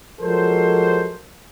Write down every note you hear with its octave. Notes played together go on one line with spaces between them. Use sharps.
F3 F#3 G#3 A4 A#4 C5